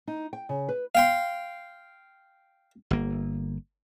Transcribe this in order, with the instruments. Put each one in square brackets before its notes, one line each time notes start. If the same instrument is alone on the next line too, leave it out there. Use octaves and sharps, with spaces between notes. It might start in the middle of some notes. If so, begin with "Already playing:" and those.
[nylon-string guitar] D#4
G5
C#3
B4
[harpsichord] F5 G5 C6
[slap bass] G1 A#3